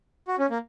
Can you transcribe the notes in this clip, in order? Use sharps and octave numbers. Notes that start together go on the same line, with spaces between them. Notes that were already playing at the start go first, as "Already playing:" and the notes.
F#4
C#4
A#3